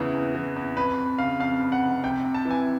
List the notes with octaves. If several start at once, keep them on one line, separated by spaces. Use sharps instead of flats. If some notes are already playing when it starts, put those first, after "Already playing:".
Already playing: E2 C#3 E3
E2
E3
E2
F2 B4
F2
C#3 F5
F2 F5
F2
F#5
F1
C3 G5
C3
A5
E3
G#5